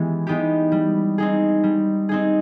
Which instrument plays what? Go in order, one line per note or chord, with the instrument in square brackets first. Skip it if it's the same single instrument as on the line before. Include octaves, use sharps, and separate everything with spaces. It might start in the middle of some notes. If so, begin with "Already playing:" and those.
Already playing: [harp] E3 G#3 B3 G4
G#3 B3 D#4 G4
G3
C4 D#4 G#4
G3
C4 D#4 G#4